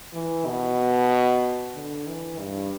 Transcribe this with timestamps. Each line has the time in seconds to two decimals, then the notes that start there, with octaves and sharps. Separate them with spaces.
0.13 E3
0.46 B2
1.74 D3
2.07 E3
2.39 G2